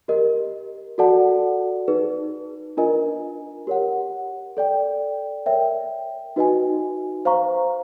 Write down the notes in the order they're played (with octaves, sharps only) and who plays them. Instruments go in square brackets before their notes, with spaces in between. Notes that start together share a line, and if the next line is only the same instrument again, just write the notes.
[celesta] G4 A#4 D#5
F#4 A4 D5 F#5 A5
D#4 G#4 B4
D4 F4 A#4 D#5 G#5
G4 A#4 C#5 F#5
A4 D5 G5
A#4 C#5 E5 G5
D#4 F#4 B4 D#5 G#5
C5 F5 A#5 C#6